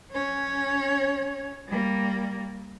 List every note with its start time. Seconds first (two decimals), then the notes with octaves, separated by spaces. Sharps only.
0.11 C#4 C#5
1.68 G3 A#3